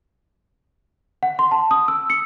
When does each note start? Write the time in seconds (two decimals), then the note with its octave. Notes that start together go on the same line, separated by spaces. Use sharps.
1.23 F#5
1.39 C6
1.51 A5
1.71 D#6
1.88 E6
2.10 C#7